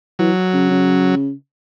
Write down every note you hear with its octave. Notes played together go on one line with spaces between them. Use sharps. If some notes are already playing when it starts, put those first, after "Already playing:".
E3 F#3
C#3
C#3